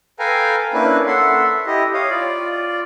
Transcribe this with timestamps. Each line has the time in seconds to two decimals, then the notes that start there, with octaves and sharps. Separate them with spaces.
0.19 A4 B4 F5 G5 G#5 A#5
0.74 A#3 C#4 D4 E4 B4
1.07 A4 E5 F#5 C6
1.67 E4 G4 D#5
1.94 C#5 F5 D#6
2.10 F4 D5